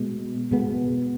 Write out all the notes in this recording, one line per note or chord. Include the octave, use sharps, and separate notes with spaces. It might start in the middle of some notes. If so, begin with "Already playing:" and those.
Already playing: B2 G#3 B3
B2 G#3 B3